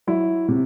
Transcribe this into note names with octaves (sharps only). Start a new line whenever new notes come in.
F#3 E4
C3